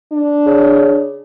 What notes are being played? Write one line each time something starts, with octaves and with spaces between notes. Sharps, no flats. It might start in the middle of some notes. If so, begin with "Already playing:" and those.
D4
C#3